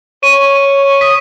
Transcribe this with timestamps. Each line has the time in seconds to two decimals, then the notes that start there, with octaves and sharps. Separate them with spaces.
0.23 C#5 C#6 D#7
0.43 C#6
1.01 D#6 B6